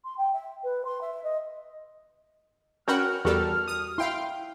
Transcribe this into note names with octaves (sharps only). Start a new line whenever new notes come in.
C6
G5
E5
B4
C6
E5
D#5
C#4 F#4 A#4 F#5 G5 B5 F6
E2 G3 F#4 A4 A#4
D#6
E4 F5 G5 C6